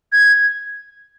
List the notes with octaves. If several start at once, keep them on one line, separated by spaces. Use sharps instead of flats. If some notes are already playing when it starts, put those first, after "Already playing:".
G#6